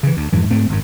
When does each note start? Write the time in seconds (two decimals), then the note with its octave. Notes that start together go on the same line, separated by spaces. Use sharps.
0.03 C#3 E3
0.17 D2
0.33 F2 G#2 E3
0.51 G#2 A3 C4
0.70 G#1 F#2